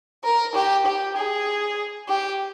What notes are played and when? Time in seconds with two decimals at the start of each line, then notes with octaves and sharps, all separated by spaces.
0.24 A#4
0.55 G4
0.86 G4
1.16 G#4
2.09 G4